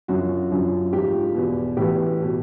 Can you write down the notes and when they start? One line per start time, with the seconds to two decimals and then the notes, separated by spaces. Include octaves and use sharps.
0.08 F#2 D3 F3 F#4
0.52 F#2 D3 F3
0.93 G#2 F3 G4
1.35 E2 B2
1.77 A2 E3 G4
2.22 B2